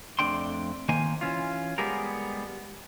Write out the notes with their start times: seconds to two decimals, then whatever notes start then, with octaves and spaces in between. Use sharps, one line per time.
0.19 F2 G#2 A3 D4 G5 C6
0.89 D#3 A#3 C5 G#5
1.21 E3 C#4 F4
1.78 G3 G#3 B3 G4 G#4 A#4